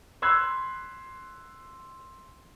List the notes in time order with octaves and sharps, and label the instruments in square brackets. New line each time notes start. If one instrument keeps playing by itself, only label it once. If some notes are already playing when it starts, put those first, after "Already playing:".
[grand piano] B5 C6 E6 F#6 G#6